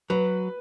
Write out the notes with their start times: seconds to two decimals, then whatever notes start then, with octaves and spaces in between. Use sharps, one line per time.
0.10 F#3 B4